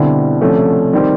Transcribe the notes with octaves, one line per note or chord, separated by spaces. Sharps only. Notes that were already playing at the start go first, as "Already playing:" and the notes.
Already playing: B2 D3 G3 C4 E4
C3 F3 A3 C#4
D#3 G3 C4